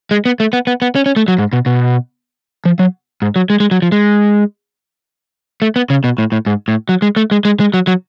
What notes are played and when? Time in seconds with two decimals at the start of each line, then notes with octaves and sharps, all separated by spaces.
0.11 G#3
0.26 B3
0.40 A3
0.53 B3
0.67 B3
0.82 B3
0.96 C#4
1.06 C#4
1.16 A3
1.28 F#3
1.39 G#2
1.53 B2
1.66 B2
2.65 F3
2.79 F#3
3.22 G#2
3.36 F#3
3.50 G#3
3.60 G#3
3.71 F#3
3.82 F3
3.92 G#3
5.62 A3
5.76 B3
5.90 C#3
6.04 B2
6.18 A2
6.32 A2
6.46 G#2
6.68 A2
6.89 F#3
7.02 G#3
7.16 A3
7.31 G#3
7.45 G#3
7.60 G#3
7.74 F#3
7.87 F#3